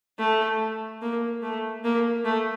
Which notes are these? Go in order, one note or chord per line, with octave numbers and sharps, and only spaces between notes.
A3
A#3
A3
A#3
A3